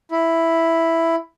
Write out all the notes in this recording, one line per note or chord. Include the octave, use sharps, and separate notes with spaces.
E4